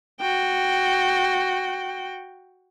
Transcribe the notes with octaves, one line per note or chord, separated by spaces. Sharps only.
F#4 G5